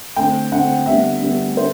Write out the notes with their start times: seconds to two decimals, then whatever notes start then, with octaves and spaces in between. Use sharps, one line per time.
0.16 D3 A3 C4 G5
0.51 D3 A3 C4 F#5
0.86 D3 G3 B3 D4 E5
1.22 D3 G3 B3 D4
1.57 D3 C5